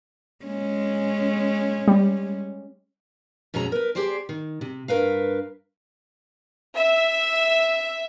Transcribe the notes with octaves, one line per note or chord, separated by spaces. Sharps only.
G#3 C#4
G3
F2 B2 G#3 C#4 A#5
A#4 B4
G4 G#4 C5 D5
D#3
C3
G2 A#4 B4 F5
E5